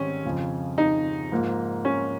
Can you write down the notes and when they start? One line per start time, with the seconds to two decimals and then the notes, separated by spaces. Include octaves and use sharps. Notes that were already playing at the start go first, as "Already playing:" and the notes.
Already playing: G#2 D#3 G3 C4 C#4
0.25 F2 C#3 F3
0.78 D#4
1.32 G#2 F3 A#3
1.85 C#4